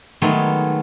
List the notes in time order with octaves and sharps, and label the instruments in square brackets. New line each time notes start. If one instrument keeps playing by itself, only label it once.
[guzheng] D#3 F#3 G#3 A3 B3